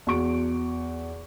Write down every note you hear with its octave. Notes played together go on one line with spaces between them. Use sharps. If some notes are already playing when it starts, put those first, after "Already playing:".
E2 F#4 C#6 D7